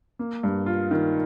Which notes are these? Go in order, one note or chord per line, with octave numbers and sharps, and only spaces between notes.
A#3
G2
F4
D#3